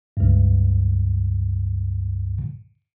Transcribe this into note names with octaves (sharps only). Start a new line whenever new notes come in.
C#2 G2